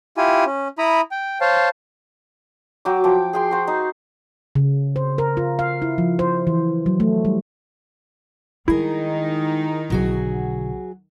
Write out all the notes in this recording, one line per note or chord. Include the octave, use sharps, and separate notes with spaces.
E4 F4 G4 G#5
C#4
E4 A#5 B5 D#6
G5
C5 C#5 F5 A5
F#3 G5 D6
F3 G5 D6
G#4 G5 C6
F#4 C5
D#4
C#3
C5
A#4
F4
F5
E4
F3
C5
E3
F#3
A3
G3
D#3 G3 G#3 D#4 E4 G#4 A#4
B1 D3 F#3 F#4 G#4